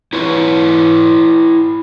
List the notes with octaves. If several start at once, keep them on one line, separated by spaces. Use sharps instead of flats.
E4 B4 C#5